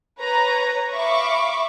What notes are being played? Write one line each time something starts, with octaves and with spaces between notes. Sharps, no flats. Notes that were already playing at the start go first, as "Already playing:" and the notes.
B4 C#5 A#5
E5 F5 B5 C#6 D6